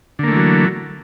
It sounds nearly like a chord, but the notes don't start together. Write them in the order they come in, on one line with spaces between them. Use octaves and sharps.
D3 A#3 A3 E3 F#3